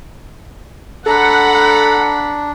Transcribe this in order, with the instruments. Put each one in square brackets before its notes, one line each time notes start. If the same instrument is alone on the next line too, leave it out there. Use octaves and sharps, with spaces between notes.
[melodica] D4 [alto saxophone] A4 [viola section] F#5 [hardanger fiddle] A#5 B5